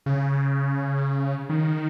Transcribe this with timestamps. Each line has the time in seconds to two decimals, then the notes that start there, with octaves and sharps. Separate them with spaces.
0.06 C#3
1.49 D#3